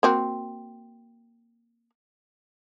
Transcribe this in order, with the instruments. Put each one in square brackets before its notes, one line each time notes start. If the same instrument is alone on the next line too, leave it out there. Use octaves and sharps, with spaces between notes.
[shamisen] A#3 C4 F#4